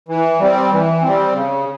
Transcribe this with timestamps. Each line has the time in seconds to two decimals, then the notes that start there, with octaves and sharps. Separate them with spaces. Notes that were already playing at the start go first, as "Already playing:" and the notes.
0.09 E3
0.40 G3 C4
0.72 E3
1.02 G3 C4
1.34 C#3